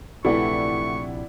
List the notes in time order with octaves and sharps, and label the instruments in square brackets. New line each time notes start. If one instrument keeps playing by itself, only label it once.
[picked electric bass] A#1 C3 [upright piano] E3 A3 [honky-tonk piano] E4 D5 F#5 [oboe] C#6